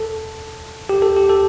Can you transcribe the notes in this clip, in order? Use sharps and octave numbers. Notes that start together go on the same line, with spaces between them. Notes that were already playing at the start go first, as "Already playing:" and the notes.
Already playing: A4
G4
A4
G4
A4